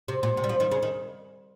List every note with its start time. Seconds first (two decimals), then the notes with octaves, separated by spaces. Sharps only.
0.08 C3
0.23 A#2
0.37 C3
0.44 G3
0.49 F3
0.60 D#3
0.71 C#3
0.83 D#3